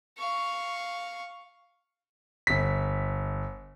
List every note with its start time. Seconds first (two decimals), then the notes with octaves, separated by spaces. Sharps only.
0.18 F5 C#6
2.47 G1 B6